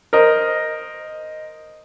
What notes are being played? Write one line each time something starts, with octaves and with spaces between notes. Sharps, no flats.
A#4 C5 D#5